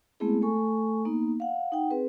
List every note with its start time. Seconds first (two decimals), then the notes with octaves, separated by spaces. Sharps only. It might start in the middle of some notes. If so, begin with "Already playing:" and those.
0.20 G#3 A3 B3 C4 E4 G#4
0.42 A3 A4 G#5 C#6
1.05 A#3 B3 D#4
1.40 F5 F#5
1.72 D#4 F#5 G5
1.91 C4 G#4 B4